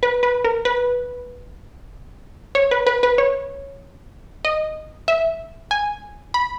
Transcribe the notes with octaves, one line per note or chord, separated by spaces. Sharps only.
B4
B4
A#4
B4
C#5
B4
B4
B4
C#5
D#5
E5
G#5
B5